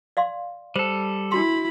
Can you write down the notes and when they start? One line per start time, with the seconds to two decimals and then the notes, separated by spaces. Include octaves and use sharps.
0.17 D5 F5 C6
0.76 G3 A4 C5
1.32 D4 E4 F#4 B5 C6